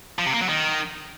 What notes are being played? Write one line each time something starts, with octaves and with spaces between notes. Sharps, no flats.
F3
C3
A#3
F#3
D#3